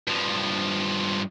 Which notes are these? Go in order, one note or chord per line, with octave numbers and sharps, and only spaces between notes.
G2 F3